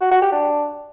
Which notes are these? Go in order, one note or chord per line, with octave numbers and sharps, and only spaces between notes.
F#4
F#4
G4
D4